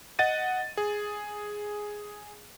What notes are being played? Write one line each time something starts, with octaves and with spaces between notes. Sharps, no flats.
D#5 F#5 A6 D#7
G#4